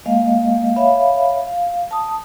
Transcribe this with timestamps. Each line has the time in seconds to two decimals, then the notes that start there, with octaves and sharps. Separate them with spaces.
0.06 G#3 A#3 D#5 F5
0.76 C#5 E5 F5 B5
1.47 F5
1.91 A5 D#6